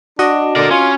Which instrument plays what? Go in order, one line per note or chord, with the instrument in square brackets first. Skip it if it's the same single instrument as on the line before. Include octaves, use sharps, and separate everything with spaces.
[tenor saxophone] D4 [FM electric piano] F#4 D#5
[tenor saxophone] D3 [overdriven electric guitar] A#4 D5
[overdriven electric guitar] C#4 [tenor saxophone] F4